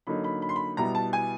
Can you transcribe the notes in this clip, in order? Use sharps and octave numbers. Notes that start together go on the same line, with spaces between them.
D3 F#3 A#3 D#4 B5
B5
B5
C6
B5
B2 G3 B3 E4 A#5
A5
G#5